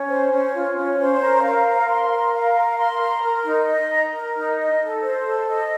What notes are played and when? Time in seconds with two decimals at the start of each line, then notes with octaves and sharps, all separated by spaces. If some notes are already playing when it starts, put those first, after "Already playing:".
Already playing: C#4
0.09 C5
0.31 C#4
0.54 F4
0.76 C#4
0.99 C5
1.21 A#4
1.43 F5
1.66 A#4
1.89 C6
2.11 A#4
2.34 F5
2.55 A#4
2.78 C6
3.00 A#5
3.22 A#4
3.45 D#4
3.68 D#5
3.91 A#5
4.13 A#4
4.36 D#4
4.58 D#5
4.80 A4
5.03 C5
5.25 A4
5.48 D#5